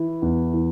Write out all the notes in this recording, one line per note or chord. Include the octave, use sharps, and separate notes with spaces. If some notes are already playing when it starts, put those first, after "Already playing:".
Already playing: E3 E4
E2
E3